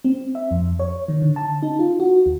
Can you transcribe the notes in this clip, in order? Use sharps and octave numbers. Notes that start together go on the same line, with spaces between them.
C4
E5
F2
C#5
D#3
D3
A5
D#4
F4
F#4
D#2